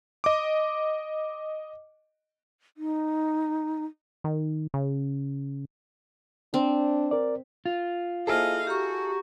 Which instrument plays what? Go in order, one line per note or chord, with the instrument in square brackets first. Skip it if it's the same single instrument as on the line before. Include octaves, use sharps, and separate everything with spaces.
[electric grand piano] D#5 D6
[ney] D#4
[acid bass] D#3
C#3
[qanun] C4 [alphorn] D4
[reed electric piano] A#4 D5
[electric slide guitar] F4
[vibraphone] A#3 C5 [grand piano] E4 G#4 A4 [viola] D#5 F5
[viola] F#4 [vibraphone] G4 A#5 C#6